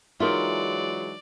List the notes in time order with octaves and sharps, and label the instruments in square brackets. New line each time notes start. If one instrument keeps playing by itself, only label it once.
[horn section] E3 F#3 G#3 [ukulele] D#4 A#4 E5 [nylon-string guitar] F4 [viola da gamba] D5